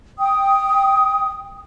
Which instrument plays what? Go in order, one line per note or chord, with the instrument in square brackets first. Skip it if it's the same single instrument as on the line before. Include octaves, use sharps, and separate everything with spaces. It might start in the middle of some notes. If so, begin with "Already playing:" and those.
[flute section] G5 D#6